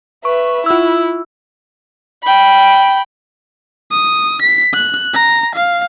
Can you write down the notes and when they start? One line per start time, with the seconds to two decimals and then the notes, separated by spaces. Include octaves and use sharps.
0.25 B4 E5 C#6
0.66 E4 F4 E6
2.23 G5 B5
3.92 D#6
4.42 B6
4.74 F#6
5.14 A#5
5.56 F5